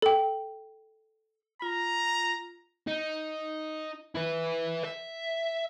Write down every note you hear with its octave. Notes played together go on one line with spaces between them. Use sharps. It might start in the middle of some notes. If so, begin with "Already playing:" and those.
A4 G5
F4 A#5
D#4
E4 B4
E5